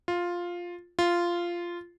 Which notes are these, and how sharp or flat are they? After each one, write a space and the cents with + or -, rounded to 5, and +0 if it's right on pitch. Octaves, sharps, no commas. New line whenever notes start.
F4 +5
F4 -10